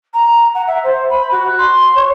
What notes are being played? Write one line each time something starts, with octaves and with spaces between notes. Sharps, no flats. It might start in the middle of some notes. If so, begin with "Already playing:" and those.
A#5
F#5
E5
C5
B5
F#4
C6
C#5